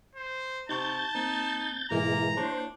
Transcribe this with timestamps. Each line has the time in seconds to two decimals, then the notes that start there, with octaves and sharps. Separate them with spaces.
0.15 C5
0.69 C3 D#4 A5 C#6 G6 A6
1.15 A#3 C4 D#4 A#5
1.91 G#2 B2 E3 G#3 A#3 A#5
2.37 A#3 D4 E4 C5 C#5